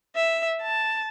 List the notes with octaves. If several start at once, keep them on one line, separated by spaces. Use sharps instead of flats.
E5
A5